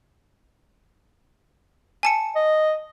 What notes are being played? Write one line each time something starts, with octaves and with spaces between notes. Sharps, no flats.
G#5 A5 C#7
D#5